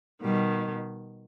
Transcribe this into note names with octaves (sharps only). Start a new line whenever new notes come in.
B2 D#3 G3